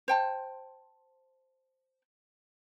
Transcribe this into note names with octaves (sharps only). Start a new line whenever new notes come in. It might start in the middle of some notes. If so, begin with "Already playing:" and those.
C5 G5 A5